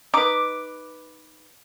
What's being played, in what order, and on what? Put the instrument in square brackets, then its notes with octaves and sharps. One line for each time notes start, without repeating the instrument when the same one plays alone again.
[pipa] D#4 B4 [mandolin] D6